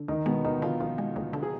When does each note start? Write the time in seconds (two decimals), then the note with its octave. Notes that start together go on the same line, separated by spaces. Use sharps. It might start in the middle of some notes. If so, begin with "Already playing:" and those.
Already playing: D3
0.08 D2 D#3 D#4
0.26 B2 G#3 B3
0.44 D2 D#3 D#4
0.62 D3 F3 F4
0.80 D2 F3 F4
0.98 G#3
1.16 D2
1.33 D3
1.43 G#4